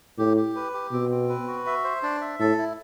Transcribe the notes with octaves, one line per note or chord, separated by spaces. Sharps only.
A2 G4
G4
B4
G4
B2 C4
C4
B4
F#4
E5
C5
D4
E5
A2 A4
E4